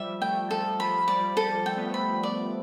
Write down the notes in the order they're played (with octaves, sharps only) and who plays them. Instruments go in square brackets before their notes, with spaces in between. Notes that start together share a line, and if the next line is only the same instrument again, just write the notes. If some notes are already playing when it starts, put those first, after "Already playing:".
Already playing: [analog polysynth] F3 G3 [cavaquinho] E5
[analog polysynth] A3 [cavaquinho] G5
[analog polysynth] F3 [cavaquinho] A4
[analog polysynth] F3 [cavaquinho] B5
[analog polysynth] G3 [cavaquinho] D5
[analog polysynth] G3 [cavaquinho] A4
[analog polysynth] A3 [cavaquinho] G5
[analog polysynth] B3
A3
[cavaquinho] B5
D5